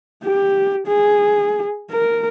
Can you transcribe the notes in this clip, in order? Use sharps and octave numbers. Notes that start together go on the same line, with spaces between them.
G4
G#4
A#4